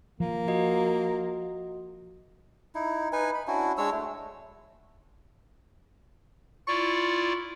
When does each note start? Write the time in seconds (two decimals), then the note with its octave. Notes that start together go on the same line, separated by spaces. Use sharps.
0.20 F3 A#3
0.48 F#4 D#5
2.75 D#4 E4
3.13 D#4 B4 G#5
3.35 B5
3.47 C#4 D4 E4 F#4
3.78 G#3 D4 C#5 E6
3.92 A3
6.68 E4 F4 D5 C#6